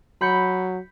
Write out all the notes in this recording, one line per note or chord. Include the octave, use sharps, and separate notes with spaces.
F#3 B5 G6 C#7